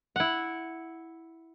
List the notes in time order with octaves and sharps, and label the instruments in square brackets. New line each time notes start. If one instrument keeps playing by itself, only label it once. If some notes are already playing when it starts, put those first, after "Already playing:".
[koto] E4 F#5